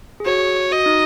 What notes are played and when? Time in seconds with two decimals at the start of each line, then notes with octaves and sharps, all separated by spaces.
0.20 G#4
0.26 F#4 C#5
0.71 F#4 D#5
0.86 D#4